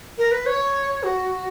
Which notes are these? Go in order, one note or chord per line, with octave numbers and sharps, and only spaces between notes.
A#4
B4
C#5
F#4